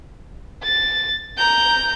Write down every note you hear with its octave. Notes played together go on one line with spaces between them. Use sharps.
A6
A#5 G6